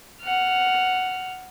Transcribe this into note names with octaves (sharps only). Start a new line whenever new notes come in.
F#5 F6